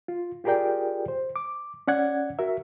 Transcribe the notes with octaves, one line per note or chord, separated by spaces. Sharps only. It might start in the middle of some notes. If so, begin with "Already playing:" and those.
F4
F4 G4 G#4 A#4 D5 G5
C5
D6
C#4 D5 F#5 G#6
F#4 A#4 E5